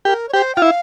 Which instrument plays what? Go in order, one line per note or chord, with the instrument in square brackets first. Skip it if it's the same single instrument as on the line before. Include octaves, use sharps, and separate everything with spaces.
[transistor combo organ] G4 [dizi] A#4
[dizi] C#5
[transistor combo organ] G4 [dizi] C5
[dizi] G5
[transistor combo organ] F4
[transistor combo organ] E4 [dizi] F5